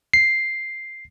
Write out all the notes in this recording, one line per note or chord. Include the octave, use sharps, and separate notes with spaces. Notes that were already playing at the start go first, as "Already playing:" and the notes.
C7